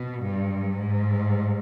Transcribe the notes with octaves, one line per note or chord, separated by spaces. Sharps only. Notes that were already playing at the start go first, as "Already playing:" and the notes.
Already playing: B2
G2
G#2